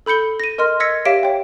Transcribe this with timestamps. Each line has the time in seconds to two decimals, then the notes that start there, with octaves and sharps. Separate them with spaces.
0.06 A4 B5 G6 C#7 G7
0.40 A#6 D#7
0.58 A#4 D#5 C6 F6
0.80 D#5 E6 G#6 A#6 B6 C#7
1.05 G4 C#5 E5 F5 B6 D7
1.23 C#5 G5